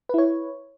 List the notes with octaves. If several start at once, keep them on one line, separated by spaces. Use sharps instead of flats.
E4 B4 C#5